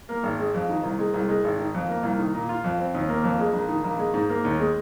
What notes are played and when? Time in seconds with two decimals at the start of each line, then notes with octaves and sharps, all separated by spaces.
0.09 A#3
0.23 G#1
0.39 G#3
0.54 F2
0.69 D#3
0.83 C2
0.99 G#3
1.14 C2
1.29 G#3
1.44 G#1
1.59 D#3
1.74 F2
1.89 A#3
2.03 C2
2.19 D#3
2.34 A#2
2.49 F4
2.64 F2
2.79 C4
2.94 D#2
3.09 A#3
3.24 F2
3.40 G#3
3.53 A#1
3.68 D#3
3.84 A#1
3.99 G#3
4.14 G#2
4.29 A#3
4.45 D#2
4.59 G#3